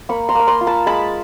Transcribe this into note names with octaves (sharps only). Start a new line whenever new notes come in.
A#3 B5 C#6
A#5 C6
A#3 B5
A#5 C6
F4
A5 B5
G#3 A5 B5